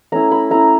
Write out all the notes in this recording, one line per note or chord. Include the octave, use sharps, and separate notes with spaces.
A3 C#4 E4 A#5
B5
A3 C#4 E4 A#5